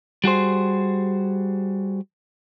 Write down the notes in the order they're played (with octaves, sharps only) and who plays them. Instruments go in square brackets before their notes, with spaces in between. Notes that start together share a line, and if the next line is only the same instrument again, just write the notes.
[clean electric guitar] G3 F#4 G#4 C5